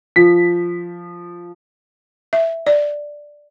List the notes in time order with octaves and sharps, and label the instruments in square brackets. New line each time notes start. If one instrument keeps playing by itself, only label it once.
[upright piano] F3 B6
[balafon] E5
D5